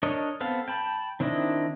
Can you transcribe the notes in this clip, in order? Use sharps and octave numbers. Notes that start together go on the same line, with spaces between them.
D4 A#4 C#5 D#5
B3 C4 A4 F5
G5 A5 B5
D#3 C4 D4 E4 D#5